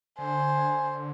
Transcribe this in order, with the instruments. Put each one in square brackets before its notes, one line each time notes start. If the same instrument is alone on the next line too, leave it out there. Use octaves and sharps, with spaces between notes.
[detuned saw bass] D3 [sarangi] C5 [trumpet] G#5